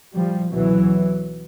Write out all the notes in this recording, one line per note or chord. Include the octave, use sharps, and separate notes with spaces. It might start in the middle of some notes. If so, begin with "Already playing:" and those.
F3 G3
C#2 B2 E3 F#3